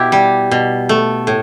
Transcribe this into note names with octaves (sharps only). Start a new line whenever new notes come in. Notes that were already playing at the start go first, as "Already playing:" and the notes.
Already playing: B2 E4 G4
G3
B2
A3
A2